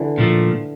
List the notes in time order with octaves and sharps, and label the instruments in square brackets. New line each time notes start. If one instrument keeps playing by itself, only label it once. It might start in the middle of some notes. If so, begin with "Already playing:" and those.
Already playing: [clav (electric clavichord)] D3 E3
[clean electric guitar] A#2 F3 A3